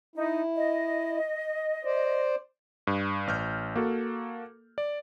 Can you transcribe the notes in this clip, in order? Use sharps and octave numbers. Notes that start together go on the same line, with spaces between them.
D#4 E4
D#5
C5 D5
G2
A1 F6 G6
A#3 F#4 A4
D5